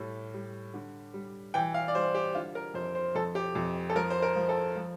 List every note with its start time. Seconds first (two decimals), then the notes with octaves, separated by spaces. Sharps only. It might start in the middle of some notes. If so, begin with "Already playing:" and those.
Already playing: A2 G3
0.34 G3
0.74 D3
1.14 G3
1.54 E3 G5
1.74 F5
1.88 D5
1.95 G3 C5
2.15 G4
2.35 D3 F4
2.55 A#4
2.74 F2 C5
2.95 C5
3.15 F2 A4
3.35 G4
3.55 F2
3.90 A4
3.96 F3 A#4
4.10 C5
4.22 A#4
4.36 F3
4.49 A4
4.76 F3